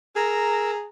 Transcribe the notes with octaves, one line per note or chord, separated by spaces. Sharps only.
G#4 A#4 A#5 E6